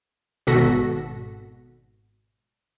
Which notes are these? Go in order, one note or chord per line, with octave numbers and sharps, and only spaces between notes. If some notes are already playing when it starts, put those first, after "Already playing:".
G#1 B2 F#4 A4 A#6 B6